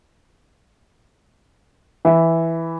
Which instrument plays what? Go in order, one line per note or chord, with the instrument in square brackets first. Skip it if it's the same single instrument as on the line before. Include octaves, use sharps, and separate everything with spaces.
[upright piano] E3 E5